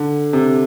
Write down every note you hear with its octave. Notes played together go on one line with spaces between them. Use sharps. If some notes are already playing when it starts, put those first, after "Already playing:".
Already playing: D3
C3